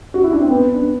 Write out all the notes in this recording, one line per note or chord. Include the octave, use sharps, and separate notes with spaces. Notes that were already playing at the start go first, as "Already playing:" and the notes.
F#4
E4
D4
C4
B3
D4